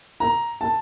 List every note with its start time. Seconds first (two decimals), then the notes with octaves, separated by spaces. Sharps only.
0.20 A#5
0.61 A5